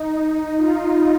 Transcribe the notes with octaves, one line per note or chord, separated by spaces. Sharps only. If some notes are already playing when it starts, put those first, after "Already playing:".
Already playing: D#4
D#4
F4